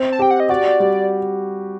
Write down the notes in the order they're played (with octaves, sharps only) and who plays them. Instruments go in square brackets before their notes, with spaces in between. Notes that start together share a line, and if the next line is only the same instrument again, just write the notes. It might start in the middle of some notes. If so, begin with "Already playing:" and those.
Already playing: [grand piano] C4
[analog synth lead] A5
[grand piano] G4 [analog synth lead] G5
[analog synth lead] F#5
D#5
[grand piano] F#4 [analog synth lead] D5
[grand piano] G3